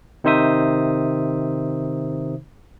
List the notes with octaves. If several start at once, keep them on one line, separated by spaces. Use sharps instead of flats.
C3 D#3 D#4 C5 E5 D#6